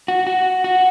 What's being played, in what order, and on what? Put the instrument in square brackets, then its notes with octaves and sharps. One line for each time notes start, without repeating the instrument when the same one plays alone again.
[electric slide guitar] F#4
F#4
F#4